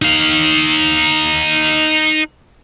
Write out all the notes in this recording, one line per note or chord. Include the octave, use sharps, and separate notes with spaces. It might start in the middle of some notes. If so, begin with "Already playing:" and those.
D#4 F5